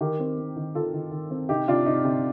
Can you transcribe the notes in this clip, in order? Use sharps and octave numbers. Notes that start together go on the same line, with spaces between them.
D#3 G4 A#4
C4
C4
D#3
D#3 F4 A4
D#3
D#3
C4
C3 D#4 G4
C3 D4 F4
C3 D#4
C3